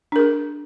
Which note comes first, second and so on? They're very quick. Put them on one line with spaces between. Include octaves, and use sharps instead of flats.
D4 A#4 G#4